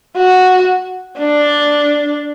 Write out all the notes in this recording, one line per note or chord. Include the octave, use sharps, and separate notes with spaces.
F#4
D4